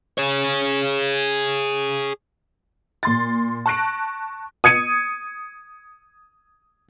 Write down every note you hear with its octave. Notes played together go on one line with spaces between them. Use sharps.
G#4 C#5
A#2 C6 A6
A5 C#6 F#6 A#6 D7
D#6 G#6 C#7 D#7